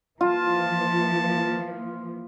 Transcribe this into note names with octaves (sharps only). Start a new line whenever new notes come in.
E3 F3 A#3 F4 A5